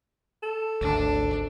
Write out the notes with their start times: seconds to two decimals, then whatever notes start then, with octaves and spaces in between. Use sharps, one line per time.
0.43 A4
0.81 G#1 D2 D4